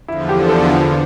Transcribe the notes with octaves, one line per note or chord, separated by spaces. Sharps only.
E2 D3 F3 E4
G4
A4